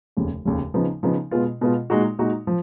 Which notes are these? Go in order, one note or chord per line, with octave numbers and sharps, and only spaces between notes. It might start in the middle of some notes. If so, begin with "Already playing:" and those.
F1 D#2 C#3
F1 D#2 C#3
C#3 F3 B3 D#4
C#3 F3 B3 D#4
B2 G#3 B3 F4
B2 G#3 B3 F4
A#2 G#3 D#4 F#4
A#2 G#3 D#4 F#4
F3